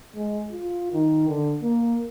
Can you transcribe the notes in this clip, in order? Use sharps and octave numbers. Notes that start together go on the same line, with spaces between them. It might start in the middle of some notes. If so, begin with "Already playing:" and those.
G#3
F4
D#3
D3
A#3